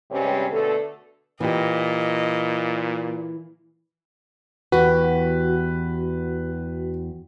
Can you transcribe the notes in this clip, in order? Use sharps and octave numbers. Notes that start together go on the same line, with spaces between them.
G2 C3 G3 G#3 C4 C#4
B2 D3 A3 A4
A#2 E3 G4 D#5
E2 E3 F#4 G4 B4